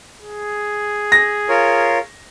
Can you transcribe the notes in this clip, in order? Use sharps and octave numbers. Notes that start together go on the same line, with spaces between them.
G#4
A#6
F4 A#4 C#5